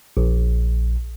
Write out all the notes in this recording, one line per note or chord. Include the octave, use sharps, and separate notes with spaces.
A#1